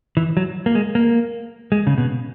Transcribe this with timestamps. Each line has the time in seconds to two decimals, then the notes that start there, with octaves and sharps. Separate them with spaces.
0.17 E3
0.37 F#3
0.66 A#3
0.75 G#3
0.95 A#3
1.72 G#3
1.87 C#3
1.98 B2